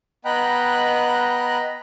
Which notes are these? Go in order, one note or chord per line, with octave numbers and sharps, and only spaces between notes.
B3 D#5 G5 A#5 B5 F#6